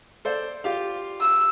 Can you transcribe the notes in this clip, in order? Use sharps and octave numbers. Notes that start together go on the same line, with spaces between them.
A4 C5 D5
F4 G4 F5
E6